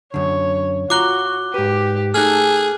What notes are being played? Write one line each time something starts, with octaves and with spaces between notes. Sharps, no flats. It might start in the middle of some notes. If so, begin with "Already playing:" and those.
F#2 D3 C#5
F4 F#4 A#5 D6 F#6 G7
G#2 G4 B4
A3 D#4 G#4 A4 F6 F#6